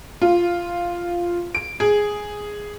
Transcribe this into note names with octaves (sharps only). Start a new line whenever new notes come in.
F4
D7
G#4